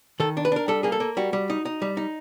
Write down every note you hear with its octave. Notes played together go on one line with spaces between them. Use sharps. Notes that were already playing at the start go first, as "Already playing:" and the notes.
D#3 A4
D4
B4
D4 A#4
G3 A4
A#3 G#4
A4
A#3
G3 F#4
G3
D#4
D#4
G3
D#4